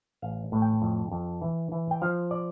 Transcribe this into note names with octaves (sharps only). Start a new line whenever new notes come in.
A1 F5
A2
G5
F2
F2
E3
E3
G5
F3 F5
D5